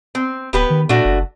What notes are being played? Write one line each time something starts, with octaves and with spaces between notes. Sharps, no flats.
C4
D1 B3 G4 B4
D#3
A#2 A3 D4 F#4
F#1